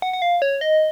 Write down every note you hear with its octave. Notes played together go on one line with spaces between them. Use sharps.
F#5
F#5
F5
C#5
D#5